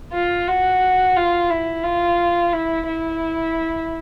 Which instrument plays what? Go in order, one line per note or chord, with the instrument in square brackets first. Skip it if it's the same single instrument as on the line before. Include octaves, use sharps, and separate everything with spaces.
[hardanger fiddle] F4
F#4
F4
E4
F4
E4
E4